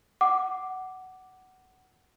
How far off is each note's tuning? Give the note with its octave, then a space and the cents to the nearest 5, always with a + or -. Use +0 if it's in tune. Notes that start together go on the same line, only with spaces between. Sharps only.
F#5 +15 D6 +0